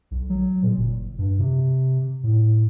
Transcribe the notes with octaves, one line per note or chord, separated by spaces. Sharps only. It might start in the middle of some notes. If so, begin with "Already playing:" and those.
B1
F#3
A#2
F#1
G2
C3
A2